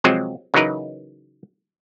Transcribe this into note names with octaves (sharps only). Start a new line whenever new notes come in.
C3 F3 F#3 G#3 C4
C#3 E3 F#3 D#4 A#4 B4